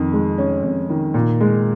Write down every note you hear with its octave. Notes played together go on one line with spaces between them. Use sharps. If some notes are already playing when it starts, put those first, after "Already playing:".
Already playing: F2 D#3
G#3
C#4
F2
D#3
A#2
G#3